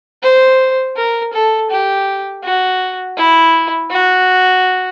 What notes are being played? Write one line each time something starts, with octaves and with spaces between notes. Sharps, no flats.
C5
A#4
A4
G4
F#4
E4
F#4